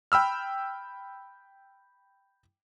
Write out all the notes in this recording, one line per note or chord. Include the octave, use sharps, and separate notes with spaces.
G5 B5 E6 F6